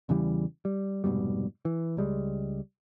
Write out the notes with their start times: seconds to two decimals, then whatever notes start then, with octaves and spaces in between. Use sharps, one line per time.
0.09 E2 C#3 E3 G3
0.65 G3
1.04 F1 G#2 B2 G3
1.65 E3
1.97 C#2 G3 G#3